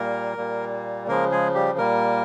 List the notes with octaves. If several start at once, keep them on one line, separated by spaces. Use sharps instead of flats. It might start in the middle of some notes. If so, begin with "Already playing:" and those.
Already playing: A#2 G3 A#3 A#4
A#2 G3 A#3
C#3 F3 G#3 A#3 A#4
G#3 G#4
G3 G4
A#2 G3 A#3 A#4